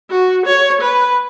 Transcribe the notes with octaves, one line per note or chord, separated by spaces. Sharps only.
F#4
C#5
B4